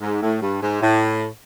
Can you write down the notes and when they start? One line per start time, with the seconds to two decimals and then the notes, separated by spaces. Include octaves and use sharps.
0.02 G#2
0.22 A2
0.41 G2
0.62 G#2
0.82 A2